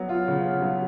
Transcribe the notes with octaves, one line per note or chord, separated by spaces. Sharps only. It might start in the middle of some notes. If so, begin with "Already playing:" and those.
Already playing: F#3 B3
F4
C#3
B3
F#3